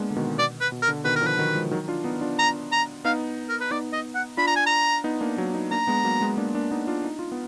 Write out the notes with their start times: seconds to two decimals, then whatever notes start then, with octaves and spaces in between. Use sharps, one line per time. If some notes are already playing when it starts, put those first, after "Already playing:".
Already playing: G#3 A#3 B3 D4
0.11 D3
0.16 B2 D#3
0.38 B2 D5
0.61 B4
0.72 B2
0.82 A#4
0.88 D3
1.05 B2 D#3 B4
1.16 A#4
1.21 D3 F3
1.27 B4
1.39 D#3 F#3
1.55 F3 G#3
1.71 D#3 F#3
1.88 D4 F4
2.04 B3 D#4
2.21 D4 F4
2.39 A#5
2.72 A#5
3.05 B3 D#4 F5
3.49 A#4
3.61 B4
3.71 B3 D#4 D5
3.93 D#5
4.15 F#5
4.37 D4 F4 B5
4.47 A#5
4.56 G#5
4.66 A#5
5.04 B3 D#4
5.21 A#3 D4
5.37 F#3 A#3
5.54 B3 D#4
5.71 A#3 D4 A#5
5.87 G#3 B3
6.04 F#3 A#3
6.21 G#3 B3
6.37 A#3 D4
6.54 A#3 D4
6.71 B3 D#4
6.87 D4 F4
7.05 D#4
7.19 F4
7.32 B3